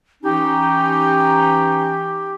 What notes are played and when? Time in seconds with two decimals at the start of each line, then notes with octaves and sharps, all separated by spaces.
0.24 E3 C#4 D#4 G4